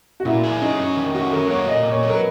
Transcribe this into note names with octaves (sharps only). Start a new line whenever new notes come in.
F#4
A#2 E4
G#4
F#3 D#4
C#4
D#3
C#4 F#4
F#3 A#4
A#3 C#5
A#2 D#5
A#2
C#5
F#3
A#4
B4